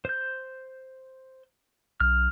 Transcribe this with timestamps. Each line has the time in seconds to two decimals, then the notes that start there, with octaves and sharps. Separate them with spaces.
0.05 C5 G6
2.00 B1 F6